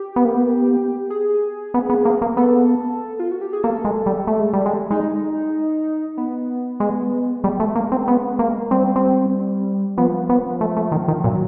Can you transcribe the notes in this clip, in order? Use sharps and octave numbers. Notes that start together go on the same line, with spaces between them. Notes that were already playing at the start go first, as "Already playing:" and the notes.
Already playing: G4
B3
A#3
B3
G#4
B3
B3
A#3
A#3
B3 A4
F4
F#4
G4
G#4
A#3 A4
G#3
G3
A3
G#3
G3
G#3
G#3 D#4
B3
G#3
G3 G#3
A3
A#3
C4
B3
A#3
G3 C4
C4
F3 B3
B3
A3
A3
D#3
D#3
A#2 F#3